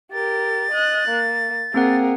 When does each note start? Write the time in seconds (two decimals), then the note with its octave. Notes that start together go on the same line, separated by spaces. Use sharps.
0.12 G4 A#4 A6
0.71 D#5 F#6
1.09 A#3
1.74 A#3 C4 G#4 A#4 F#5